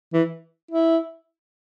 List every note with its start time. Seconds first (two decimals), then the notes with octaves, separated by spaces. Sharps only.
0.13 E3
0.71 E4